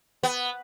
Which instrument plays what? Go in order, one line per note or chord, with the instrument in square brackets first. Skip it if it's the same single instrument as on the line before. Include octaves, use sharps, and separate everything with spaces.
[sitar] B3